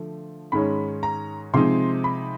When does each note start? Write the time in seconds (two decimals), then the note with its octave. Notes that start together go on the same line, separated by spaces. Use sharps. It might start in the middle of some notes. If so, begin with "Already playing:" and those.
Already playing: D3 F3 A3
0.52 G#2 D#3 G#3 C#4 B5
1.03 A#5
1.53 C3 F3 G#3 C4 D#4 C6
2.04 B5